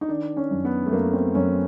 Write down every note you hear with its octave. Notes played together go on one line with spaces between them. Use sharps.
D#4
D#3 D4
C#4
F#2
B3
A3
F#2 A#3
C4
F#2 C#4